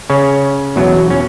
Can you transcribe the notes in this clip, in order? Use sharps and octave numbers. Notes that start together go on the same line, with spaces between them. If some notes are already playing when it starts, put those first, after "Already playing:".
C#3 C#4
E2 B2 F#3
C#4